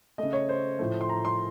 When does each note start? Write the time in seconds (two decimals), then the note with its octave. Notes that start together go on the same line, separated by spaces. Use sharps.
0.18 C#3 A3 D#5
0.33 C#5
0.49 C5
0.79 A2 F3 A3
1.01 C6
1.09 A#5
1.25 C6